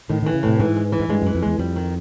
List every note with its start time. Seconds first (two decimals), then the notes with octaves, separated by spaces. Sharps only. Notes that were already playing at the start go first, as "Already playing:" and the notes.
0.09 A2 D#3
0.22 D#3 E3
0.34 C#3
0.43 A2 C3
0.60 G#2 E3
0.76 G#3
0.92 E3
1.00 G#2
1.09 G2 G#3
1.22 F#2 E3
1.35 F2
1.42 E2 G#3
1.59 F2 G3
1.76 D#3